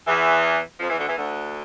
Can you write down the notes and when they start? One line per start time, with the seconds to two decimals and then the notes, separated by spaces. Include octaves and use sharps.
0.07 E2 E3
0.80 F2 F3
0.89 E2 E3
0.98 D2 D3
1.07 E2 E3
1.16 D2 D3